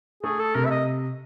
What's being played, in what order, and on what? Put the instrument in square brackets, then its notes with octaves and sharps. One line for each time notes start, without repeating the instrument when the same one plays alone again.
[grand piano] A3 [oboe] G#4
[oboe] A4
[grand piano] C3 [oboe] A#4
[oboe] E5
D#5